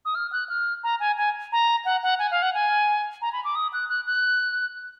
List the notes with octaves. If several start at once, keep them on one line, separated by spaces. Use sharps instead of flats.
D#6
F6
F#6
F6
A#5
G#5
G#5
A#5
F#5
F#5
G#5
F5
F#5
G#5
A#5
B5
D6
D#6
F#6
F#6
F#6